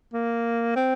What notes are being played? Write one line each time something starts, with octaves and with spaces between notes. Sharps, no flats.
A#3
C4